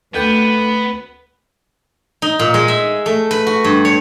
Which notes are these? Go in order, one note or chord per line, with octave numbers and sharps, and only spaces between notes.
D2 D3 B3 B4 G5
D#4
A#2
G#3
E5
A3
B4
F#4
G2
C#5